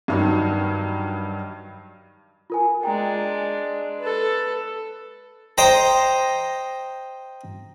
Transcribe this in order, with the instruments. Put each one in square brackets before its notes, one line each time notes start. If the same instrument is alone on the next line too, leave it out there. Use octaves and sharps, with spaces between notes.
[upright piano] G2 D#3 F#3
[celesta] F4 A#4 G#5
[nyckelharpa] G#3 D4 [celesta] G5 A#5
[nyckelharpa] A4 B4
[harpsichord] C5 D#5 G5 A#5